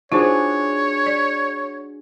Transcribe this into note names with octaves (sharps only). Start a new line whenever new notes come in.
D4 D#4 F4 F#4 G#4 C5 C#5
D5